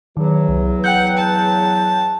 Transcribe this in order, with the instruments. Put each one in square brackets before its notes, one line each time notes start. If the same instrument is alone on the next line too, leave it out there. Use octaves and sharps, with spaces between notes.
[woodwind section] E2 F#3 [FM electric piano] D#3
[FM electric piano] C2
[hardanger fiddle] F#5 [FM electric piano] G5 F#6 G6
[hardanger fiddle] A5